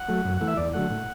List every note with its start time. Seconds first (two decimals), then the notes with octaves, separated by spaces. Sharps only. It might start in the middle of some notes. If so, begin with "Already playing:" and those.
Already playing: F#5
0.08 F#3 A3
0.25 F#2
0.37 E3 A3 F#5
0.47 E5
0.57 E2 D5
0.73 D3 F#3 A3 F#5
0.90 A2